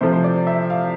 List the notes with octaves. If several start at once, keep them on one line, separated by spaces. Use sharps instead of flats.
C3 F3 A3 C5
C5
D5
E5
F5